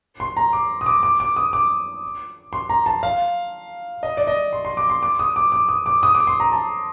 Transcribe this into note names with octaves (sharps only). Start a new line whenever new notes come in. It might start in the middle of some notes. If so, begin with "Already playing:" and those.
C6
A#5
D6
D#6
D6
D6
D6
D#6
D6
C6
A#5
A5
F5
D#5
D5
D#5
C6
C6
D6
C6
D6
D#6
D6
D6
D#6
D6
D#6
D6
C6
A#5
A5